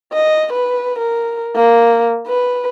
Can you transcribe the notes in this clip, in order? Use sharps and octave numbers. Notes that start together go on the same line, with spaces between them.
D#5
B4
A#4
A#3
B4